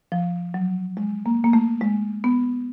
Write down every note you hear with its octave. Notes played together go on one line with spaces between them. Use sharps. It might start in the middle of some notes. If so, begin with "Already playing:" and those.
F3
F#3
G#3
A#3
A#3
A3
G#3
B3